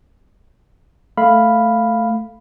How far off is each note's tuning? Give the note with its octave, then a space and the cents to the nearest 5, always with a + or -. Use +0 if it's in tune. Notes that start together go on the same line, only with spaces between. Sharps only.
A3 +0 F5 +0 B5 +0